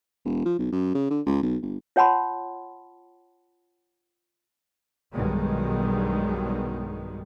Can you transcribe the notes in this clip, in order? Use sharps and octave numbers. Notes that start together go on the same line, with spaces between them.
E1
F3
B1
F#2
C#3
D3
C#2
B1
G1
F4 C#5 F#5 A5 B5 C6
B1 G2 B2 D#3 G3 G#3